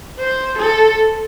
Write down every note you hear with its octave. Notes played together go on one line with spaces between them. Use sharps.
C5
A4